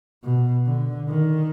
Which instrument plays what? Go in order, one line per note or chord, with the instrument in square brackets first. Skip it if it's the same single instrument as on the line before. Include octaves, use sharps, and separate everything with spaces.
[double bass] B2
D3
D#3